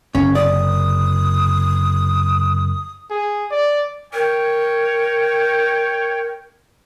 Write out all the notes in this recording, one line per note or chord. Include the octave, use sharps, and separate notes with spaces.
F#1 C3 C#4
D5 D#6
G#4
D5
A#4 C#5 G5